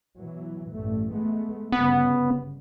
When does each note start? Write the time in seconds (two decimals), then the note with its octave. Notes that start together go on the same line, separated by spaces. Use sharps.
0.18 B2 E3 F#3
0.71 A1 G2 A3
1.13 G#3 A3 B3
1.72 G1 G2 C#3 B3